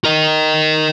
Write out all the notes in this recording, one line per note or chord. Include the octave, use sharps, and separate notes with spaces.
A#4 D#5